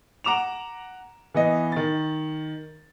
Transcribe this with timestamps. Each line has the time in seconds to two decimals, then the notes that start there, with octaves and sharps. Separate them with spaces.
0.24 F#5 A#5 D6 E7 F7
1.34 E3 B3 D#5
1.72 D#3 A6